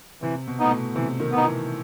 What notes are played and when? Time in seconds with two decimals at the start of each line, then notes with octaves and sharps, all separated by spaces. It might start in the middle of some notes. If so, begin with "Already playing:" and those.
0.22 C3 E3
0.47 B2
0.59 A2 B3 D#4
0.71 B2
0.95 C3 E3
1.20 D#3
1.32 B3
1.37 D#4
1.44 E3